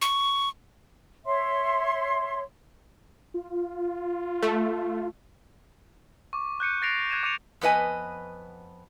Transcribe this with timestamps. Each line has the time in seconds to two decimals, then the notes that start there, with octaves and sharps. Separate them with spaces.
0.02 C#6
1.25 C#5 E5 C6
3.34 F4
4.43 A3
6.33 C#6 D6
6.60 F#6 G6 C#7 D#7
6.82 F#6 A6 A#6 C7 D7 F7
7.10 F#6 G#6 D#7 E7
7.23 D6 G6 C#7 D#7 F7
7.61 F2 B3 B4 D#5 G#5